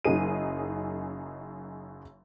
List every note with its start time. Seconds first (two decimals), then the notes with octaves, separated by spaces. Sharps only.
0.05 F#1 F#2 D#4 G#4 D#7